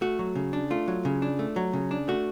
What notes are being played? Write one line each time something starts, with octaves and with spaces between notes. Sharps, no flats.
A3 F#4
F#3
C#3
D4
A3 F4
F#3
C#3
D4
A3
F#3
C#3
D4
A3 F#4